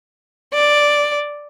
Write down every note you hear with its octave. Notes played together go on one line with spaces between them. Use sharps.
D5